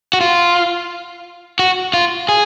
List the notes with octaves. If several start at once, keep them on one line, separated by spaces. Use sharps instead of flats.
F#4
F4
F#4
F4
G#4